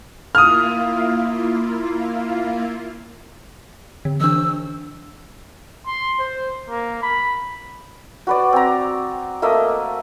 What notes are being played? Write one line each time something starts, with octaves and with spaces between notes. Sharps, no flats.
A#3 E4 F4 D#6 F6
D3
E3 D4 E6
C6
C5
A#3
B5
F#4 B4 D5
C4 A#5
A3 A#3 D#5 E5